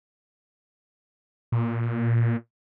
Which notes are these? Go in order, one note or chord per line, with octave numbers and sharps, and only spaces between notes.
A#2